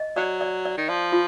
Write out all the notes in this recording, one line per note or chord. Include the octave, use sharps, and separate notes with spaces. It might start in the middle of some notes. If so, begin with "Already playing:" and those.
Already playing: D#5
F#3 D5
D5
D5
D#3
F3 D5
F4